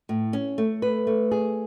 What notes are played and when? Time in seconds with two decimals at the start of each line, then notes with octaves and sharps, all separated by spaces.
0.09 A2
0.33 C#4
0.58 A3
0.82 B4
1.07 A3
1.31 G#4